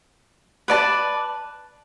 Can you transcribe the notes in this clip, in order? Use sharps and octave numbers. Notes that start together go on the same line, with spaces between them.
B4 D5 A5